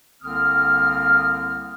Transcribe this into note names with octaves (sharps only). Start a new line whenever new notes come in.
C2 D3 A#3 C4 D#6 F6